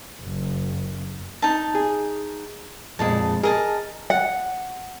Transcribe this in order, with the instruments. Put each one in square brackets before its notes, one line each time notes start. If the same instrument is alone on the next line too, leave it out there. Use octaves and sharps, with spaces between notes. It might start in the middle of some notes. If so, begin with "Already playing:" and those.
[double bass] F#1
[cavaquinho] D#4 A5
[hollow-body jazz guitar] G#4
[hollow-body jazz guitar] F2 A#2 G#3 [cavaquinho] A5
[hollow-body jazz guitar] G#4 [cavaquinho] A#4 D#5 A5
[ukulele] F#5